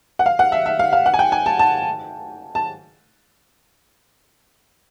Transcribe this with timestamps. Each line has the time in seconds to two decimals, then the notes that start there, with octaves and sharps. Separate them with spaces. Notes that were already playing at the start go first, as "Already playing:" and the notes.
0.19 F#5
0.26 F5
0.39 F#5
0.52 E5
0.66 E5
0.79 F5
0.93 F5
1.06 F#5
1.14 G#5
1.19 G5
1.32 G#5
1.46 A5
1.59 A5
2.55 A5